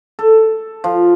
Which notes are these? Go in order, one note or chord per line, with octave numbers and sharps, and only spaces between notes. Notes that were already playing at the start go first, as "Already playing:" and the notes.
A4
F3